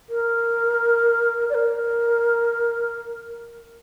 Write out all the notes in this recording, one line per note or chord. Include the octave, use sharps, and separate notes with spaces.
A#4
D5
A#4